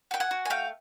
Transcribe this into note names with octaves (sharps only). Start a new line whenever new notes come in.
F#4 G5
F#5 G#5
F#4
G#5
A3 F5 G5